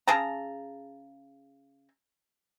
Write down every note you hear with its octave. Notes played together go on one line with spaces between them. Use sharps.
C#3 G#4 A5 A#5